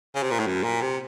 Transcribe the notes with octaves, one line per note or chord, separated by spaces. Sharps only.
C#3
C3
A#2
A2
F#2
A#2
C3